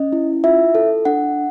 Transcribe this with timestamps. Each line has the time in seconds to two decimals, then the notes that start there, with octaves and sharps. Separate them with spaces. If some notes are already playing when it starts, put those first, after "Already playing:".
Already playing: C#4 D#5
0.12 E4
0.44 F4 E5
0.75 A4
1.05 D4 F#5